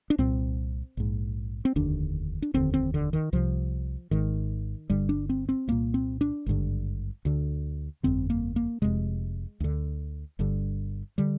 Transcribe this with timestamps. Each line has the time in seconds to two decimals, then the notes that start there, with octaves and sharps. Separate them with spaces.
0.10 D4
0.18 C2 A#2 C4
0.97 A#1 G#2
1.65 C4
1.76 F1 D#2 D3 D4
2.42 D4
2.54 F1 D#2 D3 C4
2.74 C4
2.94 D3
3.13 D#3
3.33 C2 C3 F3
4.11 G#1 G#2 D#3
4.90 G1 G2 D3 G3
5.09 D4
5.29 C4
5.49 C4
5.67 C2 A#2 A#3
5.94 C4
6.21 D4
6.46 G#1 G2 D3
7.25 D2 D3
8.03 G1 F2 D3 C4
8.30 A#3
8.56 A#3
8.82 F1 F2 C3 G#3
9.60 D2 D3
10.39 G1 G2 D3
11.18 D3 G3